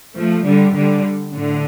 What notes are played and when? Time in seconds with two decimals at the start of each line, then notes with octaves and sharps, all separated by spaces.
0.17 F3 A3
0.46 D3 G3
0.76 D3 G3
1.34 A2 D3